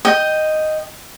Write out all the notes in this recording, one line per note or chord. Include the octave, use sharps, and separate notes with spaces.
D#5 G5